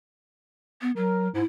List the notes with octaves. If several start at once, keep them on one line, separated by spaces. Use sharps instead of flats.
B3
F#3 A#4
G#2 E4